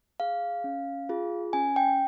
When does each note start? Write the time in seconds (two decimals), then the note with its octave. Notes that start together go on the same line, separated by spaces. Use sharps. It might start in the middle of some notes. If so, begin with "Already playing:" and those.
0.20 G#4 F5
0.64 C#4
1.09 F4 G#4
1.53 C#4 G#5
1.76 G5